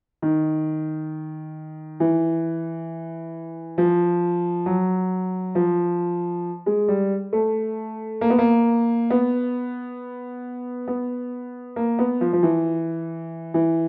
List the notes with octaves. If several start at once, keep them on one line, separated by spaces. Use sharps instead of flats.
D#3
E3
F3
F#3
F3
G#3
G3
A3
A#3
B3
A#3
B3
B3
A#3
B3
F3
F3
E3
E3